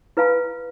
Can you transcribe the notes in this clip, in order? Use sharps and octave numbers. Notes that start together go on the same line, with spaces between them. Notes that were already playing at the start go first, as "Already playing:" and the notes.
E4 B4 F5 G#5 B5